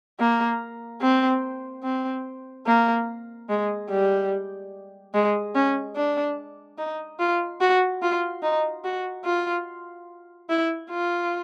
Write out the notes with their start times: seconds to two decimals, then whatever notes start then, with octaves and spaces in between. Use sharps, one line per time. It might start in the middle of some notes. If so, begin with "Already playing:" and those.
0.20 A#3
1.02 C4
1.84 C4
2.67 A#3
3.49 G#3
3.90 G3
5.14 G#3
5.55 C#4
5.96 D4
6.78 D#4
7.19 F4
7.61 F#4
8.02 F4
8.43 D#4
8.84 F#4
9.25 F4
10.50 E4
10.91 F4